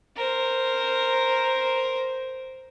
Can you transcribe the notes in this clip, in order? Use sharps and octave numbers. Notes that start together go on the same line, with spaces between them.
A#4 C5